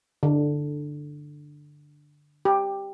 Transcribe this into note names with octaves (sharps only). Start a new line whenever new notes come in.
D3
G4